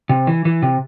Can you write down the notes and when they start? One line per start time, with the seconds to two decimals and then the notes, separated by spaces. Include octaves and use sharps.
0.09 C3
0.27 E3
0.45 E3
0.62 C3